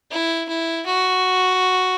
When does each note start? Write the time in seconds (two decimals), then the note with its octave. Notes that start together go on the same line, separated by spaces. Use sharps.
0.11 E4
0.49 E4
0.86 F#4